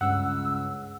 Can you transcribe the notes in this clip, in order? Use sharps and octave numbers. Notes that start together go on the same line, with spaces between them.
C#2 G2 F#5 E6